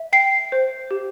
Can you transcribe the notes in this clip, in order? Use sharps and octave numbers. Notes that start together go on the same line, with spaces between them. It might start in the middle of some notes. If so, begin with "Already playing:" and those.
Already playing: E5
G5 C7
C5
G4